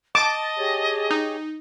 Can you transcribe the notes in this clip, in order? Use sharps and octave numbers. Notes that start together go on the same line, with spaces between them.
D#5 A5 D6 A6
G4 G#4 C#5
D#4